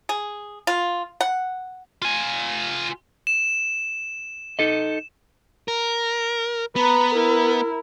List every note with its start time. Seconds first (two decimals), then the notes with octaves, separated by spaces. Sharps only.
0.09 G#4
0.67 F4
1.21 F#5
2.02 F4 G#5
3.27 E7
4.59 D#4 A4 D#5
5.68 A#4
6.76 B3 B4 A#5
7.14 E4 A#4